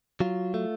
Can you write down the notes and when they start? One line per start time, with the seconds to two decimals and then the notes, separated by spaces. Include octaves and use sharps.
0.20 F#3 F4
0.54 A3